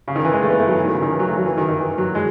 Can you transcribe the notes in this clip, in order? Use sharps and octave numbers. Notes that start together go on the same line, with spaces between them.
C#3
D#3
E3
G#3
A3
B3
A3
F#3
E3
D#3
C#3
D#3
E3
F#3
A3
F#3
E3
D#3
D#3
E3
F#3
G#3